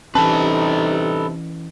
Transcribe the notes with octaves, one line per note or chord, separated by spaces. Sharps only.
C3 E3 G3 C#4 D#4 A4 B4 A5